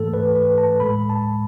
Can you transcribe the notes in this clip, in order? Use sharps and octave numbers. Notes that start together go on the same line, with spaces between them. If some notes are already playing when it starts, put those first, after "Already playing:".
Already playing: G#2 E3 A3 A4
B4
B4
A5
A2 G#3 B5
A5